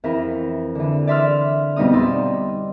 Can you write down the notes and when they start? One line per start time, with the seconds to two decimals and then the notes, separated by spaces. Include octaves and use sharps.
0.04 F2 E3 E4 A#4
0.75 D3 E3
1.07 D5 E5 C6 E6 F6
1.76 F2 B2 G3 D#4 D#6
1.93 D#4 D5 C6 E6